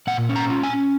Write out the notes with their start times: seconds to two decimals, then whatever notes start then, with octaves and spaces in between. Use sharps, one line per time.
0.07 A#2 F#5
0.29 C#4
0.36 A#5
0.50 F4
0.63 G#5
0.70 C#4